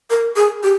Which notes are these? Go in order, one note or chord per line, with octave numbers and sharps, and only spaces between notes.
A#4
G#4
G4